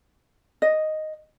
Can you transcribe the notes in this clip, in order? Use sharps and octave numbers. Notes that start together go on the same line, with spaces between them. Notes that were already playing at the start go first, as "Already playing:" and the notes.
D#5